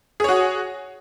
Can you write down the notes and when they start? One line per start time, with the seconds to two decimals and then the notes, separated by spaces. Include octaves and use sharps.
0.20 G#4
0.24 C#5
0.28 F#4